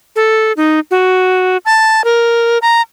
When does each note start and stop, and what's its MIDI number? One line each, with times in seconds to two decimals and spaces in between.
0.16 0.52 69
0.57 0.80 63
0.91 1.57 66
1.65 2.04 81
2.04 2.58 70
2.62 2.82 82